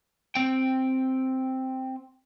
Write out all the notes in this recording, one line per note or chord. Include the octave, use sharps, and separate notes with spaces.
C4 G5